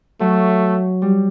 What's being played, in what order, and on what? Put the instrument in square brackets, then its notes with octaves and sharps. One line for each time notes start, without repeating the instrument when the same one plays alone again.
[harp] F#3 [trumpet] A3
[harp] G3